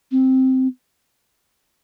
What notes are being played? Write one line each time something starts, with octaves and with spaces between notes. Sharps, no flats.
C4